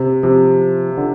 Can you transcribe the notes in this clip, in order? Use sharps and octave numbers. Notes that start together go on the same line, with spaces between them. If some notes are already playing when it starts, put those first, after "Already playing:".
Already playing: C3
C3 F3
D3